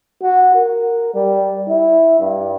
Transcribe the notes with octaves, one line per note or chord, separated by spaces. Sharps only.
F#4
A#4
G3
E4
G2